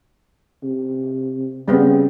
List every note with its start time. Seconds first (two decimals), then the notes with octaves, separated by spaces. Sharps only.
0.63 C3
1.68 C#3 G3 B3 C4